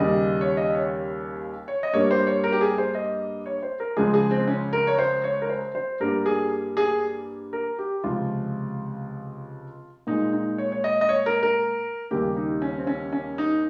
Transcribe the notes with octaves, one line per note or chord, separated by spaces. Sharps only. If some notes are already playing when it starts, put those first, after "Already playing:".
Already playing: D#2 C#3 G3 D#5
C#5
D#5
C#5
C#5
D#5
G2 G3 A#3 C#5
C5
C#5
A#4
G4
G#4
C5
D#5
C#5
C5
A#4
C#2 C#3 F3 G#3 G#4
G#4
C4
C#4
A#4
C#5
C5
C#5
A#4
C5
C5
G2 G3 A#3 A#4
G#4
G#4
A#4
G4
C#2 C3 F3 F4
A#2 G#3 D#4
D#4
C#5
C#5
D#5
D#5
C#5
A#4
A#4
D#2 C#3 G3 A#3 G4
D#4
C#4
C4
C#4
C#4
D#4